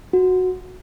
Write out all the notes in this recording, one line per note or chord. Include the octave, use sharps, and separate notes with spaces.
F#4